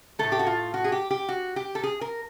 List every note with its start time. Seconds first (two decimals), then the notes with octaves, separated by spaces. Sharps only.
0.19 A2 E3 A3 A4
0.32 G4
0.39 F#4
0.46 F4
0.74 F#4
0.84 G#4
0.92 G4
1.11 G4
1.29 F#4
1.56 G4
1.75 A4
1.83 G#4
2.01 A#4